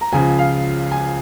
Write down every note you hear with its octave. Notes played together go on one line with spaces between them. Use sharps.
A#5
C#2 C#3 F3 G#5
F5
G#5